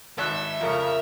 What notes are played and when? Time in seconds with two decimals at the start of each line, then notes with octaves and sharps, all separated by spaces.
0.18 G#1 E5 F#6
0.61 F2 C#3 A#4